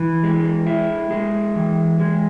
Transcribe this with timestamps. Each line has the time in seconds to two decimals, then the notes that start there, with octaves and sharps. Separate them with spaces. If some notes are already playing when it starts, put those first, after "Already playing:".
Already playing: E3
0.23 G#3
0.67 E4
1.11 G#3
1.56 E3
2.00 G#3